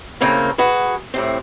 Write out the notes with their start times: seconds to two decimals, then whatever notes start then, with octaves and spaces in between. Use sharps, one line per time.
0.21 A2 C#3 A#3 C4 A#4
0.58 F#4 G#4 B4
1.14 A2 C3 C4